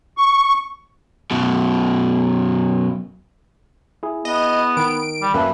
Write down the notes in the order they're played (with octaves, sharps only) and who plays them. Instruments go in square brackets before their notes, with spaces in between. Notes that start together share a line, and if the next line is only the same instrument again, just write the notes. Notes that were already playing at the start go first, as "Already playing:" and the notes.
[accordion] C#6
[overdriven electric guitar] F#2 B2
[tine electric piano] E4 G#4
[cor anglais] B3 [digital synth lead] D#5
[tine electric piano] D#3 [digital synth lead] D7
[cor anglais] G3
[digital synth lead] F#2 [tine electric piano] A#3 E5 A5 [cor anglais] B4